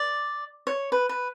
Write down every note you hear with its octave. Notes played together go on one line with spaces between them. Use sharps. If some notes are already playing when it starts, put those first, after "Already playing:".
Already playing: D5
C#5
B4
B4